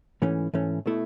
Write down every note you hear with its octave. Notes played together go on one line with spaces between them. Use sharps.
G#2 E3 A3 C#4
G#2 E3 A3 C#4
B2 A3 E4